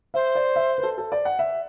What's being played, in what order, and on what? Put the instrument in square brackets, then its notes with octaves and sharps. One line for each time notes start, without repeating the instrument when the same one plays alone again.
[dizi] C5 [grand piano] E5
[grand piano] D5
E5
B4
A4
A4
D5
F#5
E5